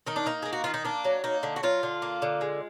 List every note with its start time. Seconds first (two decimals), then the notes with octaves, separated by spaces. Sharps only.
0.07 D#3 D#4
0.16 D4
0.26 A#3 D#4
0.42 A#3 G#4
0.53 F#4
0.64 D#3 F4
0.74 D#4
0.85 A#3 D4
1.04 F#3
1.24 A#3 D#4
1.43 D3
1.56 F#4
1.63 F#3 F4
1.83 D3
2.02 A#3
2.22 D3
2.41 G#3